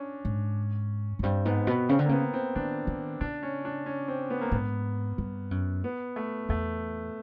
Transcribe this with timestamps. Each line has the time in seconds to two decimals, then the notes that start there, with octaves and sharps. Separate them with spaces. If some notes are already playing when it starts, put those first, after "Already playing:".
Already playing: C#4 D4
0.25 G#2
1.19 F#2
1.23 G2 C4
1.45 G#2 B3
1.67 B2 B3
1.89 C#3 C4
1.99 D3
2.06 A#3
2.09 C#3 B3
2.34 C4
2.56 D#3 D4
2.87 D#3
3.21 C#3 D4
3.43 C#4
3.65 D4
3.86 C#4
4.08 C4
4.30 B3
4.41 A#3
4.52 G#2 B3
5.18 G2
5.51 F#2
5.84 B3
6.16 A3
6.49 E2 A3